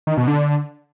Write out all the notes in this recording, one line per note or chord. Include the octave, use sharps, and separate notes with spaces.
D#3
B2
D3